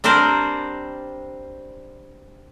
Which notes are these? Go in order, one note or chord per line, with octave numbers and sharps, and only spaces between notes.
G3 C4 D4 A#4 C5 D5